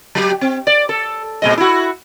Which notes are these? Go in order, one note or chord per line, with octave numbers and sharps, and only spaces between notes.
F#3 G4
C4
D5
A4
A#2 G#3 D#5
E4 F#4